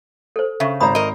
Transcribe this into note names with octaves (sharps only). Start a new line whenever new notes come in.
A4 C5
C#3 E5
G#1 C5 A#5 B5 D#6
A#4 D#5